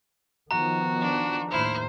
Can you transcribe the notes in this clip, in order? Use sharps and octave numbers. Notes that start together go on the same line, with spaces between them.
D#3 F3 B3 F#4 A#5
D4
D#2 A2 E4 C5 F6